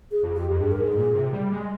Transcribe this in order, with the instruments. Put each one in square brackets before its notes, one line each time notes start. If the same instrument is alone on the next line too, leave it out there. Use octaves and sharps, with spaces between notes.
[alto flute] G#4
[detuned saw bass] F2
[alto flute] G4
[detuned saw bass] F2
[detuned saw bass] G2 [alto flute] G#4
[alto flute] A#4
[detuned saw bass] G#2 [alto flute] G#4
[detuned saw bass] A#2
C3
G3
G#3